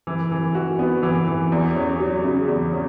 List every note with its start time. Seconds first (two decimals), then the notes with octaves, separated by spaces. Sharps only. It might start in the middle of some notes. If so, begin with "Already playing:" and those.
0.07 E3
0.31 E3
0.55 F#4
0.79 B3
1.03 E3
1.28 E3
1.52 E2
1.76 C#4
2.00 F#3
2.24 C#3
2.48 E2
2.73 C#4